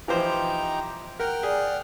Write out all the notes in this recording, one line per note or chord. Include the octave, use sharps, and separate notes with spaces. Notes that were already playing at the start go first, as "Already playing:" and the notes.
E3 F3 D#4 G4 C5 A#5
A#4 F#5 G5 F6
G#4 D5